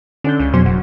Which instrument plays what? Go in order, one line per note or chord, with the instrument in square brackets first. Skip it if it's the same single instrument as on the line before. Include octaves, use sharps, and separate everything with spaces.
[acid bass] D3 [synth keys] C#4 D4 G6
[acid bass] C#2
[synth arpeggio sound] F2 B2 F#3 [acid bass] C#4 [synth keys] C5
[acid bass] F#1 [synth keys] F#4